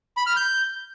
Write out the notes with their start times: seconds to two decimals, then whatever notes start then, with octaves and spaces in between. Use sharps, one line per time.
0.17 B5
0.27 F6
0.37 G6